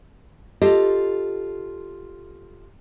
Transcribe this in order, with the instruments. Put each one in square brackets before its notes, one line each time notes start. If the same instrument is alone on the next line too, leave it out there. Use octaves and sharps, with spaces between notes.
[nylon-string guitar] F4 G4 A4 D#5